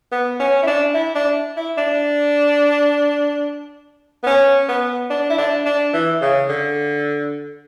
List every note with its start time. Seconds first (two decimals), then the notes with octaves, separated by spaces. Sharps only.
0.12 B3
0.39 C#4
0.63 E4
0.67 D4
0.94 E4
1.15 D4
1.56 E4
1.77 D4
4.23 B3
4.27 C#4
4.69 B3
5.10 D4
5.30 E4
5.38 D4
5.65 D4
5.93 E3
6.21 C#3
6.49 D3